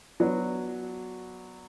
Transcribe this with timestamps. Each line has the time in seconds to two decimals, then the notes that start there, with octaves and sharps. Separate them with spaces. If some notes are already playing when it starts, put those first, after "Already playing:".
0.20 F#3 B3 D4 F#4